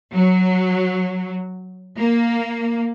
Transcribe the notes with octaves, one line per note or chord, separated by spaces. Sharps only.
F#3
A#3